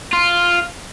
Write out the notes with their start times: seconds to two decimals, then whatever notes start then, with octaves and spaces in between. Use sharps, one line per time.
0.13 F4